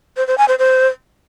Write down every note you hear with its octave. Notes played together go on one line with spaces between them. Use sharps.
C5
C5
G#5
C5
C5